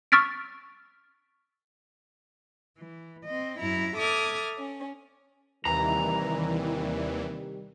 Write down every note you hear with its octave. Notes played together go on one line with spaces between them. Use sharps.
C#6 E6 F6 A6 B6 D7
E3
C4 D#5
F#2 E4 A#5
A4 E5 D6 D#6 F6 G#6
C#4
D#2 C3 D#3 E3 G3 A#5